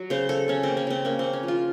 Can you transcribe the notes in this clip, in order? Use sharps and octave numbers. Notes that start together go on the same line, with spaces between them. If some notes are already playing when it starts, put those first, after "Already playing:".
Already playing: F#3
C#3 C5
C#3 A4
C#3 C#4
A#3 C4
C#4
C#3 C4
A#3 C#4
C#3 C4
C#4
F3
F4